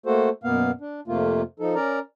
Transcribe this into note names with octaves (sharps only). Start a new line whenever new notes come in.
A3 A#3 F#4 A4 C5
F#2 B2 A#3 B3 F5
D4
F2 C3 A3 A#3 F4
F3 D#4 A4
C#4 A#4 D5 A#5